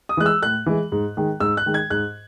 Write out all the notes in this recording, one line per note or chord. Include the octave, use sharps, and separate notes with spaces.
D#6
E3 G#3 F#6
E6
A2 F#6
E3 G#3
G#2
D#3 G#3
G#2 E6
F#6
D#3 G#3
G#6
G#2 F#6